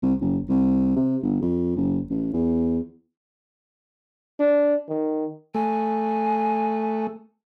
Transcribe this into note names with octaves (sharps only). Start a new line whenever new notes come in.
C2
F#1
C2
C3
G1
F2
F#1
A1
E2
D4
D#3
A3 G#5